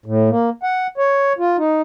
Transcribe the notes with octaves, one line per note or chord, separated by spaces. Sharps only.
A2
A#3
F#5
C#5
F4
D#4